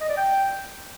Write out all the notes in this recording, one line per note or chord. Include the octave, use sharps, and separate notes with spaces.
D#5
D5
G5